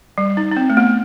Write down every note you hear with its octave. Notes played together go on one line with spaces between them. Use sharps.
G3
D#4
D#4
C4
A3
B3